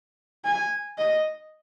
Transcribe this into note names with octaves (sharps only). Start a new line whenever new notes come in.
G#5
D#5